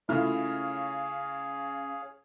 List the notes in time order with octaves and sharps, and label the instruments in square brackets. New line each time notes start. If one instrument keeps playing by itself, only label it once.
[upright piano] C#3 F6 [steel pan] A3 E4 F4 [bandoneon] G#4 C#5 F5